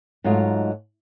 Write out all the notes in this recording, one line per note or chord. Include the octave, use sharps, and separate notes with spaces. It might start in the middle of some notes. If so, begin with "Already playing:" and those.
G#2 F#3 A3 D#4 F4